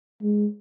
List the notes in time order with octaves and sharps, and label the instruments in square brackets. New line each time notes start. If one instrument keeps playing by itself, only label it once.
[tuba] G#3